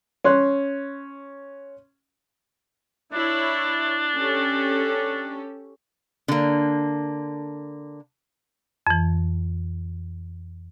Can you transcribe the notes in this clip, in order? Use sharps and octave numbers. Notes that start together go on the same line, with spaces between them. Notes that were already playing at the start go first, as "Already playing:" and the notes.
C#4 C6 F#6
D4 E4 C#5
C#4 G4 A4
D3 A#3
F2 E3